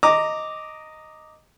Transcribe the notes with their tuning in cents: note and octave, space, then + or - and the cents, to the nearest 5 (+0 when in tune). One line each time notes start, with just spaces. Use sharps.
D#5 +0 A#5 -15 D6 +0